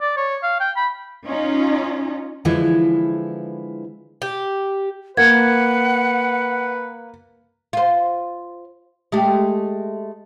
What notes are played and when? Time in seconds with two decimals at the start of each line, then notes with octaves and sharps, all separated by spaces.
0.02 D5
0.17 C#5
0.43 F5
0.60 G5
0.76 B5
1.27 C#4 D#4 F4
2.45 D3 E3 F3 G#3 E4
4.22 G4
5.17 A#3 B4 F#5 G#6
7.73 F4 C5
9.12 G#3 A3 G4